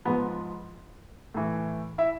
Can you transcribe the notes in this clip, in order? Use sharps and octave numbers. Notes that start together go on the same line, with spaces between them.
G#2 F3 B3 B4
A2 E3
E4 E5